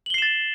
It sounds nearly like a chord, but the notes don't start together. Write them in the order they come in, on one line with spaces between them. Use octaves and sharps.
F#7 G7 C7 E7 A6